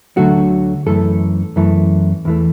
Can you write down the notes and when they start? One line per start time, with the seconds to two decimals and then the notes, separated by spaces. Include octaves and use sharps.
0.17 D2 D3 F#3 A3 F#4
0.86 F#2 E3 A3 A4
1.56 F#2 E3 A3
2.25 E2 E3 A3